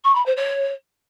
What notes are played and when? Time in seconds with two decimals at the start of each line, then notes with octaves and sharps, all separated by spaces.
0.04 C#6
0.15 B5
0.25 C5
0.36 C#5